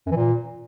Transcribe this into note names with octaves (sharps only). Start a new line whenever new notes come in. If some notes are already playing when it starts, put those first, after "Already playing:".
F#2
E3
A#2